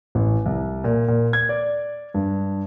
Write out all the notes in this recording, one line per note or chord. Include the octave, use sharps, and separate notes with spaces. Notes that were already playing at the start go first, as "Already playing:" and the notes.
A1
C2
A#2
A#2
G#6
D5
G2